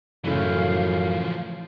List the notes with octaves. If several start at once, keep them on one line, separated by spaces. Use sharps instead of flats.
F#2 A2 C#3 E3 F3 A3 F5